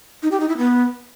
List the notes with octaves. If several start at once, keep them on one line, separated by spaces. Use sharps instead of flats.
D#4
G4
D#4
E4
B3